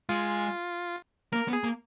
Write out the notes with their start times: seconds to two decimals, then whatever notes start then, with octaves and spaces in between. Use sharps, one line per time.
0.09 G#3 F4
1.33 A#3 A#4
1.48 B3
1.53 G#4
1.64 A#3